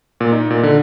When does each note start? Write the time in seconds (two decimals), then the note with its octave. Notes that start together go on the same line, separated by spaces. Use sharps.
0.20 A#2
0.32 D#4
0.50 A#2
0.63 D3